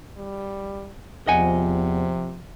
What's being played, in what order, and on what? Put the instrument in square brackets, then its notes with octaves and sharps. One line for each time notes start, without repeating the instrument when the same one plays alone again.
[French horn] G3
[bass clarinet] E2 [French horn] C3 [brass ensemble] F3 [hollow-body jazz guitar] D#5 F#5 G#5